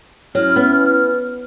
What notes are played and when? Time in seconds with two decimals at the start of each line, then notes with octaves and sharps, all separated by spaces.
0.35 F#3 C#4 E4 F6
0.56 B3